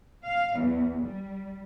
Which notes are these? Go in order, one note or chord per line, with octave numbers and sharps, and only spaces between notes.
F5
E2
G3